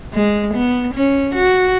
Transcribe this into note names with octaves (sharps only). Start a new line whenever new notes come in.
G#3
B3
C#4
F#4